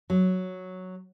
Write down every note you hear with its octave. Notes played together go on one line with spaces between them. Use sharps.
F#3